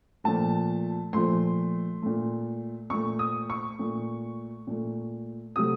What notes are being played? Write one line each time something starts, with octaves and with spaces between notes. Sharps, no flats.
A#2 F3 A3 A5
A#2 F3 A3 C6
A#2 A3
A#2 A3 C#6
D#6
C#6
A#2 A3
A#2 A3
C3 F#3 A3 D#6